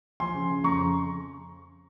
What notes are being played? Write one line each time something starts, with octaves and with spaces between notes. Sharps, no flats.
F3 G#5 C6
C#3
C#3
F2 A#5 C#6
C#3